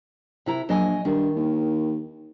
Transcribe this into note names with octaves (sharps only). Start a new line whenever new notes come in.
C3 E4 A#5
A#1 F#3 D#5 G#5
G2 D#3
D#2